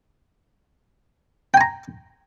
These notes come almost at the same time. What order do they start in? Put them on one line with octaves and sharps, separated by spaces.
G5 G#5 A#5